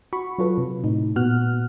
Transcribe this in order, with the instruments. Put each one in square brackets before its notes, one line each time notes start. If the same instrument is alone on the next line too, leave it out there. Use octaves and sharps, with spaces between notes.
[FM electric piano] F#4 B5 C#6
F#3 F4 A4 B4
C3
A2 D#4
A#2 B3 F#4 F6 F#6